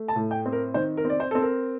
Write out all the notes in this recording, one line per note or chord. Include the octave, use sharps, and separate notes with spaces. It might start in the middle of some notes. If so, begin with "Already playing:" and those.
Already playing: A3
A5
A2
G5
C4
A#4
D#3 C5
A#4
C4 D5
C5
C4 A4
A#4